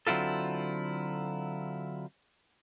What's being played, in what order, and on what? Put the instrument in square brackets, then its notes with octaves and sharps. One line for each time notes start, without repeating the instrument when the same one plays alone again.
[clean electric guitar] D3 F#3 C4 E4 F4 A4